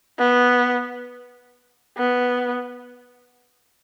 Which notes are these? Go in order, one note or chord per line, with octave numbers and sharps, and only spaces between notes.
B3
B3